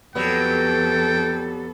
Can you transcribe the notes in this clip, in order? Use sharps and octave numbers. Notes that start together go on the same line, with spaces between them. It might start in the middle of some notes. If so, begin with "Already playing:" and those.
F2 F#3 G3 B3 A4 G5